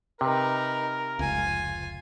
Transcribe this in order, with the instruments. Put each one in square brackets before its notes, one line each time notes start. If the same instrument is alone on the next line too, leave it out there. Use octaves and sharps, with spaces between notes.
[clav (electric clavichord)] C3 [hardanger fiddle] D#4 B4 [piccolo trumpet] A#4
[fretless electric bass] F1 C#2 [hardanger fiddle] F4 G#5